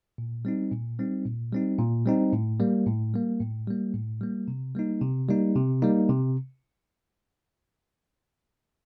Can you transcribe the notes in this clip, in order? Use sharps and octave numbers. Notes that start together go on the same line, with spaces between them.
A#2
G3 C4 D#4
A#2
G3 C4 D#4
A#2
G3 C4 D#4
A#2
G3 C4 D#4
A2
G3 A#3
A2
G3 A#3
A2
G3 A#3
A2
G3 A#3
C3
G3 A#3 D#4
C3
G3 A#3 D#4
C3
G3 A#3 D#4
C3